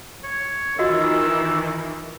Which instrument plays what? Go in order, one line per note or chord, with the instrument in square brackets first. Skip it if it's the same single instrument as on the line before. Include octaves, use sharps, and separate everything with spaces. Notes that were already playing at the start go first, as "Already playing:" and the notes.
[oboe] C#5
[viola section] D#3 E3 [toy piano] F4 F#4 D#5 [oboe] E6